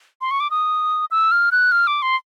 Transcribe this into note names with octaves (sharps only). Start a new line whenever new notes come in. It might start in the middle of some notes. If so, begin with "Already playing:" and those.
C6
C#6
D6
D#6
E6
F6
F#6
F6
D6
C6